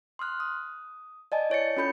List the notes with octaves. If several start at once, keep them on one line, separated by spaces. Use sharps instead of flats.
C6 D#6 F6 F#6
D#6
D5 D#5 G#5 A5
E4 C#5 A6 C#7
C#4 F4 A4 B5 G6 C#7